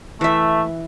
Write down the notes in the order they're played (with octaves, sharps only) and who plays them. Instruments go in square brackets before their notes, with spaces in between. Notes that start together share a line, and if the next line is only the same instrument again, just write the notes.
[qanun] E3 E5 [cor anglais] A3